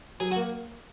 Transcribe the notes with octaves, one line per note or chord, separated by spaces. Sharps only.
F#3 G#4
F#4
A#3